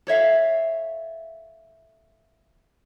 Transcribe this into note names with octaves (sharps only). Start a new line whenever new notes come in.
A4 C#5 E5 F5